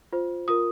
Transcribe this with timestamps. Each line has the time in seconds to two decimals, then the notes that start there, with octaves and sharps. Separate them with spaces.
0.13 F4 C5
0.48 F4 A#4 D#6